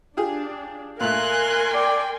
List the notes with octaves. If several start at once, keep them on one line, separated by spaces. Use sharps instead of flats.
D4 F4 G4 G#4
A#2 A3 A#4 F5 G#5 C6 F#6
D5 G5